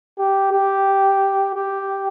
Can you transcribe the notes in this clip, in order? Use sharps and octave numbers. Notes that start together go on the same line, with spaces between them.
G4
G4
G4